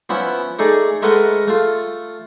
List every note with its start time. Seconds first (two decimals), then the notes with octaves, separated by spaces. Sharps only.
0.09 F3 B3 C#4 E4
0.59 A3 D#4 G#4 D5
1.02 G#3 A3 A#4 B4 D#5 F#5
1.48 A3 F4